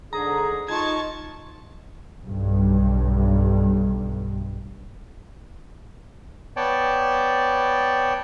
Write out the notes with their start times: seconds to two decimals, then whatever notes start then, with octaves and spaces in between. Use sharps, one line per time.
0.13 G#2 D3 G#4 A#5
0.68 D#4 F4 A5 C#6 G#6
2.26 B1 G2
6.56 B3 C#5 D5 G5 A5